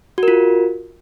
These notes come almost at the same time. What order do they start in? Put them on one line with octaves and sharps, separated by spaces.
F#4 A#4 F4